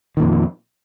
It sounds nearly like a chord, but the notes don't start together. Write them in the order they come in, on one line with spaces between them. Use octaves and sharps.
D#3 A#2 F2